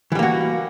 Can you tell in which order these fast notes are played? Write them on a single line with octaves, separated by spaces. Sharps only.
E3 G3 A#3 F#4